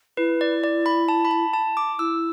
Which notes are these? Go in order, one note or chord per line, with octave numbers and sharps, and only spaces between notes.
E4 B4
D5
D5
B5
A5
B5
A5
A5
D6
E4 E6